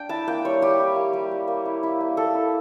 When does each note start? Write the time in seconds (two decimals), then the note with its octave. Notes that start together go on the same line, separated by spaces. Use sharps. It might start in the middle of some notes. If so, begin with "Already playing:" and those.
Already playing: D4 G5
0.09 E4 A5
0.27 A#3 G5
0.45 G3 C#5
0.62 G3 G4
0.79 E4
0.96 A#3
1.13 G3
1.31 G3
1.48 A#3
1.65 E4
1.83 E4
2.01 A#3
2.17 A#3 A4
2.34 E4